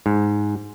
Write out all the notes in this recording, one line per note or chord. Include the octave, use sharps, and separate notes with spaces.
G#2